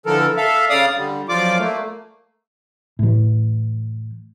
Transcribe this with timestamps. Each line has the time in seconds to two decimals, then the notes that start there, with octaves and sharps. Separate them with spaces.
0.06 D3 E3 F3 A4 A#4
0.37 A4 E5 F5
0.70 C#3 D5 F5 D#6
0.96 D3 G3
1.29 F#2 F3 F4 D5 D6
1.58 A3 A#3
2.99 A2 E3